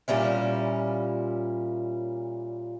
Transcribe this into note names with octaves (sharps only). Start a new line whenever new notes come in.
A#2 G3 C#4 E4